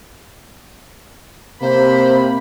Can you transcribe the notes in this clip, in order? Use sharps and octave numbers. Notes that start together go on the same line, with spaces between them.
C3 A#3 C5 B5